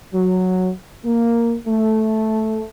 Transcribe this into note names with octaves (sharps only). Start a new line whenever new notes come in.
F#3
A#3
A3